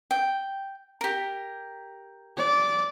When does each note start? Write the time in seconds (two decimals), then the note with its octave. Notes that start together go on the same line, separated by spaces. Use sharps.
0.11 G5
1.01 G4 A#4
2.37 D5